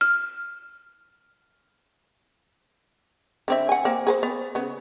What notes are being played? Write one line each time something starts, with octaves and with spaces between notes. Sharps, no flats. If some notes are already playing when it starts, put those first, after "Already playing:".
F6
D3 C4 E5
F#5 G#5
A#3 C4
G#4 B4 C5
B3
C#3 B3